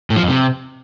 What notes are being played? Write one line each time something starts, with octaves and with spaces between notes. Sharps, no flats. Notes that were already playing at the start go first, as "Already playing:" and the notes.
A2
F3
F2
C3